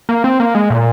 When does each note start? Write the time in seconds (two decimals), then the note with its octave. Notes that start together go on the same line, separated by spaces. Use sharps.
0.09 A#3
0.24 C4
0.40 A#3
0.55 G#3
0.70 A#2